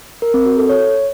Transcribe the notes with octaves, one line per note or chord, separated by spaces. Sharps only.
A#4
C4
F#4
A4
C#5